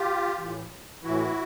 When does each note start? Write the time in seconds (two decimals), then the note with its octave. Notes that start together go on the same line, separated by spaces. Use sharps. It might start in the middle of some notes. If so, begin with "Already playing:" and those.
Already playing: F4 G4
0.38 A2 E3
1.02 A2 E3 E4 F#4